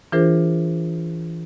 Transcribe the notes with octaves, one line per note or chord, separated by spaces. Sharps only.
E3 D4 F4 G#4 A#4 C5